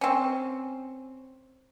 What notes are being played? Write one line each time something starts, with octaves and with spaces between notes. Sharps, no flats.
C4 C#4